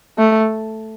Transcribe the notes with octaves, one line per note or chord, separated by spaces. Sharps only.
A3